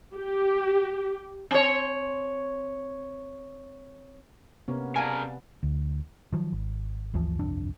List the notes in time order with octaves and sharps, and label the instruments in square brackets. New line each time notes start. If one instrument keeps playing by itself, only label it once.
[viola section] G4
[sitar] C4 C#5
[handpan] C3 B3 [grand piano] A#3 C#4
[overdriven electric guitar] C#3 A#4 [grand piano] D5 F5 A5 [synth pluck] G#5
[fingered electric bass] D2
[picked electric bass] D#3 F3 F#3
G#1
G1 D2 E3 F3
G1 C2 F2 D4